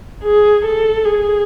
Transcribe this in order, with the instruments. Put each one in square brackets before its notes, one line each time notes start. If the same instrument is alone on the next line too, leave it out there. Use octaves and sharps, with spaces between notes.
[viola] G#4
A4
G#4